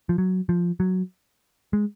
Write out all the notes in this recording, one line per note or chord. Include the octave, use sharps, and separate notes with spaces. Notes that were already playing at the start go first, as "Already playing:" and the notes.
F3
F#3
F3
F#3
G#3